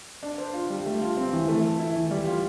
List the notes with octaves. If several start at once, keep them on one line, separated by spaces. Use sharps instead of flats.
D4
C5
F4
G3
A3
F4
C4
E3
A3
A4
E4
E3
G3
F4